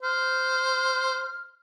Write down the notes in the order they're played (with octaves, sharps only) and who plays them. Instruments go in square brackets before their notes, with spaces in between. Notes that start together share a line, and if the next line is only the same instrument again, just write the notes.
[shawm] C5 [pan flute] F6